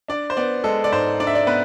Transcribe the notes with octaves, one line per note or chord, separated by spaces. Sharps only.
D4 D5
C5
B3 D5
G#3 A4
D5
G#2 C5
D4 D5
E5
D5
B3 B4